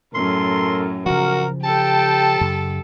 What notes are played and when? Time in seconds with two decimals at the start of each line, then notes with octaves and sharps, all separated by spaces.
0.14 F#2 A2 A4 A#4 C6
1.06 C#3 F3 F#4 A#4
1.64 G4 A4 G5 A5
2.41 F#2 C#3